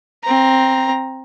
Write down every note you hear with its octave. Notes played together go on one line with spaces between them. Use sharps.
C4 A#5